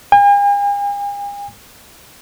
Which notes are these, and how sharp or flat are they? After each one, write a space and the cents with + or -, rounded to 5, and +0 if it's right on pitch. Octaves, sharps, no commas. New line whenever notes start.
G#5 -45